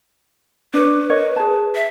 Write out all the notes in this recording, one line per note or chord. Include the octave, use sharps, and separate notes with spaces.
D4 B4 C#5
A#4 C#5 D#5
G#4 A5
E5